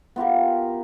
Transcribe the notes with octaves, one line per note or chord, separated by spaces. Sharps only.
B3 F4 G4 A#4